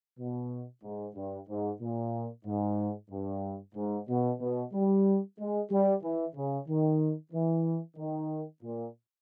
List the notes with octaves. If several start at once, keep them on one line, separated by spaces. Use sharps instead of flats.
B2
G#2
G2
G#2
A#2
G#2
G2
G#2
B2
B2
G3
G#3
G3
E3
C#3
D#3
E3
D#3
A#2